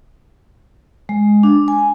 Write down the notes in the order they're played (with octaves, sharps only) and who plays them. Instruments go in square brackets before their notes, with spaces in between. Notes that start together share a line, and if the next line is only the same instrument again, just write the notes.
[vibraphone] G#3
D4
G#5